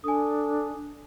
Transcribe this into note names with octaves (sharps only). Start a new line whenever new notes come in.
D4 A4 G#5 D#6